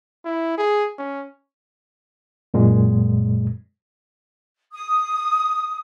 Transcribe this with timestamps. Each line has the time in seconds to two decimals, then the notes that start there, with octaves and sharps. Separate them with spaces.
0.25 E4
0.58 G#4
0.98 C#4
2.54 F#2 A#2 G#3
4.73 D#6